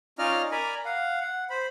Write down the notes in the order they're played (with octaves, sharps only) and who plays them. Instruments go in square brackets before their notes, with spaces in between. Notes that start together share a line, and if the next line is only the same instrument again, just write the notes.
[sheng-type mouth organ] C#4 D#4 F4 D5 D#5 F6
A#4 D5 G#5 A#5 B5
F5 F#5
F#5
C5 B5